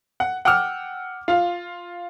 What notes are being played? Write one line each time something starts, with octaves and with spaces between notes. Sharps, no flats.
F#5
F#5 G5 D6 E6 F6
F4 F5